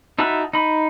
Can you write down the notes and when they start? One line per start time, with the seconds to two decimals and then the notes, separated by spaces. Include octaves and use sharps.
0.19 D#4 E4 F#4 A5 B5
0.53 D#4 B5